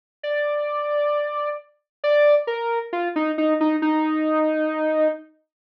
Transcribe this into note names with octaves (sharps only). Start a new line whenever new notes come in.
D5
D5
A#4
F4
D#4
D#4
D#4
D#4